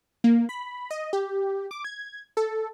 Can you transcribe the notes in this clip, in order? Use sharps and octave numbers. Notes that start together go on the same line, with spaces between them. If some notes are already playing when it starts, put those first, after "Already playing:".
A#3
B5
D#5
G4
D6
G#6
A4